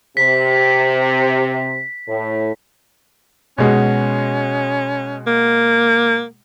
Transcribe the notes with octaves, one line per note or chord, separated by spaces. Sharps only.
C3 B6
A2
B2 G#3 C#4 F#4
A#3